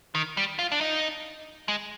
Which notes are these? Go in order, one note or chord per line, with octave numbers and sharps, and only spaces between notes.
D#3
G3
F4
D4
D#4
G#3